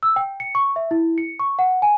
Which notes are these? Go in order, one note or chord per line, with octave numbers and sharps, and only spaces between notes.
E6
G5
C#7
C#6
E5
E4
C#7
C#6
F#5
G#5